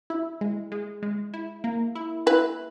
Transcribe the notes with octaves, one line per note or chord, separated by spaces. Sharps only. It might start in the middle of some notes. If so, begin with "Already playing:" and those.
E4
G#3
G#3
G#3
E4
A#3
E4
E4 B4